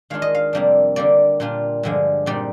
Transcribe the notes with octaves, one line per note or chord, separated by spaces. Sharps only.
D#3 G#3 D4 F4 F5
D#5
F5
F2 C3 G3 A#3 D4
D3 G3 A#3 D5
A#2 G3 D4 F4
G2 D3 F3 G#3
A#2 G3 C4 D#4 D5